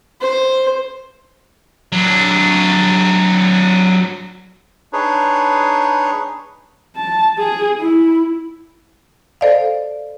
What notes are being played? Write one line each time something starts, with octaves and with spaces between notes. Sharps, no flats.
C5
F#3 D4
D4 D#4 G#4 B4 C#5
A5
G#4
E4
A4 C5 D5 D#5 F5